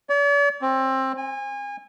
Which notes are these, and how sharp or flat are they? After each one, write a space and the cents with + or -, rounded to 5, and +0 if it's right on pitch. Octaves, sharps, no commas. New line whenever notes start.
D5 -45
C4 +20
G#5 -30